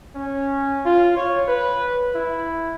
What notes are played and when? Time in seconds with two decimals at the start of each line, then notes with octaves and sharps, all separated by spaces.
0.15 C#4
0.85 F4
1.17 C#5
1.48 B4
2.15 E4